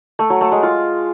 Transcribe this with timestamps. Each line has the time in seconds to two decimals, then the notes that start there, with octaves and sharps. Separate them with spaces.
0.19 A3
0.30 F#3
0.41 A3
0.52 G#3
0.63 F4